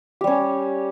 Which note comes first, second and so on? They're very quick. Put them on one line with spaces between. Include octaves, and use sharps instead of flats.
G4 G3 C#4